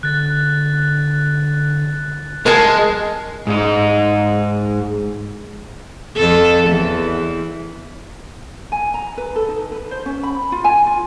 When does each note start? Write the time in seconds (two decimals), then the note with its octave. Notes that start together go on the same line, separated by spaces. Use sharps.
0.03 D3 F#6 A6
2.46 G#3 A#4 G#5 A5
3.47 G#2 D#4
6.16 F2 A4
6.68 E2 E3
8.72 G#5
8.94 A#5
9.17 B4
9.36 A4
9.49 D#4
9.72 B4
9.91 C5
10.06 C#4
10.23 B5
10.52 F4
10.64 G#5
10.87 F4